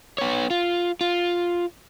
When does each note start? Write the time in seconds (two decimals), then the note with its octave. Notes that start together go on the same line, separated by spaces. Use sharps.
0.18 B3 C#5
0.50 F4
1.01 F4